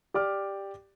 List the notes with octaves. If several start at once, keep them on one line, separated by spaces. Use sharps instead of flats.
G4 D5 D6 F6